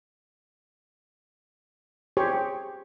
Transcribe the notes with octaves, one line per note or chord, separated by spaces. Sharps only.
G4 G#4 C5 C#5